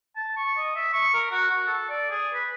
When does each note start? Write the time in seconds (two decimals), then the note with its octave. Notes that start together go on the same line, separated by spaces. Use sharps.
0.16 A5
0.37 C#6
0.57 D#5
0.76 E5
0.93 C#6
1.14 A#4
1.32 F#4
1.50 F#4
1.67 A4
1.89 D5
2.10 G#4
2.34 B4